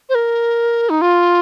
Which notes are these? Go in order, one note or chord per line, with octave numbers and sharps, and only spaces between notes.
C5
A#4
D#4
F4